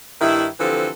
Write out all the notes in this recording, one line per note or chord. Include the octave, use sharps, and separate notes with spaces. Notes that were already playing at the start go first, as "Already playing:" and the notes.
G2 D#3 D#4 E4
D3 E3 F3 C4 G4 A4